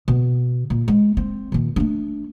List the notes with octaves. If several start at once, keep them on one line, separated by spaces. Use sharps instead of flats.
B2
A#2
G#3
C4
A#2 D#3
A3 D4